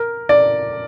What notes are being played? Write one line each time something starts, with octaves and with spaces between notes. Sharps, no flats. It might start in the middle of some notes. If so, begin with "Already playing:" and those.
Already playing: A#4
D5